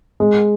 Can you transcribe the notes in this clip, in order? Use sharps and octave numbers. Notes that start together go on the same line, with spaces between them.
G#3